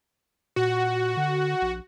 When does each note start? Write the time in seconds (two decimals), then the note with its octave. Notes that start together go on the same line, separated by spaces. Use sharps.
0.56 A#2 F#4
1.17 D3
1.62 A#1